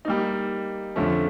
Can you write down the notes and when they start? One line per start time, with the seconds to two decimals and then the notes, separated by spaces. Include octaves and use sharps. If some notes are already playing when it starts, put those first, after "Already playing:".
0.05 G3 A#3 D#4
0.96 F2 D3 F3 A3 C#4